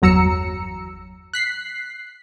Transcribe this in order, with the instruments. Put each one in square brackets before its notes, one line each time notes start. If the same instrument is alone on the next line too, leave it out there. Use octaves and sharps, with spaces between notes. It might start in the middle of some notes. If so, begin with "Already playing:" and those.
[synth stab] G1 E2 F#3 A#5 E6 C#7
F#6 B6 C7